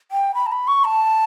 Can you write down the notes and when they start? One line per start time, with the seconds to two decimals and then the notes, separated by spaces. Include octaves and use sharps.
0.11 G5
0.35 B5
0.46 A5
0.52 B5
0.68 C#6
0.84 A5